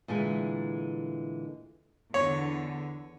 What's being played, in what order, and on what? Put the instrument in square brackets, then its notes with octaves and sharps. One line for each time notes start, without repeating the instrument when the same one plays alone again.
[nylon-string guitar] A#2 D3 E3 G#3 A3
[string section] E2 D3 [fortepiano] C#5